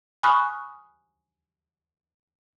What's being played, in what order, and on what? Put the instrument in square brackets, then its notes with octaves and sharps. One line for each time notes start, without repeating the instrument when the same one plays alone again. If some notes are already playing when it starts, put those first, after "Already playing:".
[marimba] G#5 B5 C#6 D#6 F6 F#6